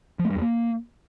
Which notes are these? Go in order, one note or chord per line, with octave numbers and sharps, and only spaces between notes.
F3
A3
G2
E2
A#3